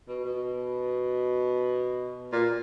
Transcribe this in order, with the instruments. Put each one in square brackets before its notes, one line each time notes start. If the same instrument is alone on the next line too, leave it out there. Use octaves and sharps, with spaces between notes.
[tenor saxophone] B2
B2
A#2